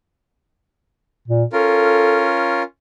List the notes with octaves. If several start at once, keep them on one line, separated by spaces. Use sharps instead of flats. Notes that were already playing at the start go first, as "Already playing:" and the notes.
A#2
C#4 F4 A4 A#4